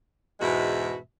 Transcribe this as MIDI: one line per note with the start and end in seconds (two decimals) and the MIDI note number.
0.40 0.96 40
0.40 0.96 44
0.40 0.96 47
0.40 0.96 56
0.40 0.96 66
0.40 0.96 76